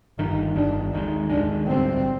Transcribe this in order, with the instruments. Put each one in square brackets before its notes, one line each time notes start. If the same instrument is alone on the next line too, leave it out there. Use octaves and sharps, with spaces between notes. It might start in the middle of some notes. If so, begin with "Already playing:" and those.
[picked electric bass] G1 G2 D#3 [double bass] D#4
[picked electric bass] G1 G2 D#3 [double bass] D4
[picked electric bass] D#2 D#3 G#3 [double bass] D#4
[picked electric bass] D#2 D#3 G#3 [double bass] D4
[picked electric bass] D2 D3 G3 [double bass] C4